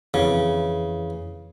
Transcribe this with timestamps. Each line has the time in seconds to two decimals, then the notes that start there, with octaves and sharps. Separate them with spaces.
0.14 F2 C#3 E3